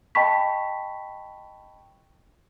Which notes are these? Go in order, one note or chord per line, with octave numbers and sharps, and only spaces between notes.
D#5 G5 A5 B5 C#6 B6